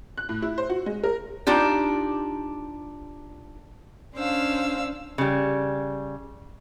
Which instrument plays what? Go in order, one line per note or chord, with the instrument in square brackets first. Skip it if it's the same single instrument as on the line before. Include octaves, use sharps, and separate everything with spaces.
[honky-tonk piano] F#6
A2
E4
C5
F#4
G#3
A#4
[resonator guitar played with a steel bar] D4 D#4 F4 G4
[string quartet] C#4 D4 C5 F5 E6
[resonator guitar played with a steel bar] C#3 G3